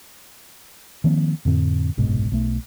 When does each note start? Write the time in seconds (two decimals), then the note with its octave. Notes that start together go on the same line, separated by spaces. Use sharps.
1.04 D#3 F3 A#3 C4
1.45 F2 A2 D3 C4
1.97 F#1 C2 G#2 B2
2.32 B1 A3